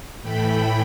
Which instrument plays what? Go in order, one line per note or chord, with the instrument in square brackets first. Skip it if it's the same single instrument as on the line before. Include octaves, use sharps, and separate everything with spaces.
[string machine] A2 E3 A3 G5 B5